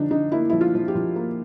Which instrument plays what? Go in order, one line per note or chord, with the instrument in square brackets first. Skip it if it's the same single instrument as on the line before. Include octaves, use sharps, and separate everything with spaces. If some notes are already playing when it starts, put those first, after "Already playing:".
Already playing: [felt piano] D3 F3 D4 D#4
D3 D#4
A#3 E4
F3 E4
F4
F3
G4
F3
A#3